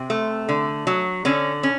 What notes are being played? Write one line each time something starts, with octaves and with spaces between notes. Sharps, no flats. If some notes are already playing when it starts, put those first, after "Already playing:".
Already playing: C3 C4
A3
D3
F#3
D3 C#4
C#4